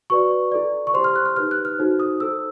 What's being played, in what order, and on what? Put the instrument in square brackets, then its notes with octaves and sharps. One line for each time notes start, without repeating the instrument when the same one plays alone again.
[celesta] F#4 B4 D5 C#6
E4 A4 D5
C#6
E4 G4 C5 C6
F6
F#6
F6
D#4 G4 B4 F6
F#6
F6
D#4 F#4 A4 C5
D#6
E4 A4 C5 E6